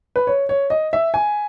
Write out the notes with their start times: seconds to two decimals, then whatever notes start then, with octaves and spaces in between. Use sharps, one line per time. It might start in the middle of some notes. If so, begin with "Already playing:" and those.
0.16 B4
0.27 C#5
0.49 C#5
0.70 D#5
0.93 E5
1.14 G#5